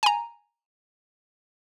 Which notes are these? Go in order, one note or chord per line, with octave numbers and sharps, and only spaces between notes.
G#5 A#5